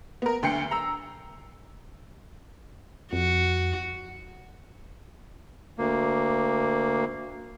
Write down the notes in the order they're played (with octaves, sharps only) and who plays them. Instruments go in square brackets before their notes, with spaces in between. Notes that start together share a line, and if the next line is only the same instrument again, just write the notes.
[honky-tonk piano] B3 A#4
D2 D3 G5 C7 C#7
A#5 E6
[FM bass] F2 [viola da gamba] F#4
[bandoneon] D2 A#3